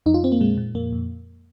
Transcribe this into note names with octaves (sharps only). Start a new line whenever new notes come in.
F2 D#4
F4
F2 C4
A#3
A#2 G#3
A#2
F2 A#3
F2